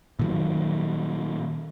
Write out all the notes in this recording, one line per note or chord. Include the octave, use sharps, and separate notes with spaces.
A#2 D#3 F#3